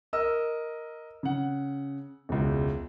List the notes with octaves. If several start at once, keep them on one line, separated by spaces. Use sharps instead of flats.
A#4 D#5 E6
C#3 F#5
E1 C#2